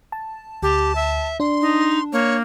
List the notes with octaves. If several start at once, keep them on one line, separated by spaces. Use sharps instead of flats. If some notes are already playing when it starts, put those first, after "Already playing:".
A5
D2 G4 A5
E5
D4 C6
D#4
A#3 C#5